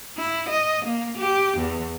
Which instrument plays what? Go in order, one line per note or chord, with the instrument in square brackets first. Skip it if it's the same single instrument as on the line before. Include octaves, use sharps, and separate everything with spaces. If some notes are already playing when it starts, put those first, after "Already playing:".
[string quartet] E4
D#5
A#3
G4
E2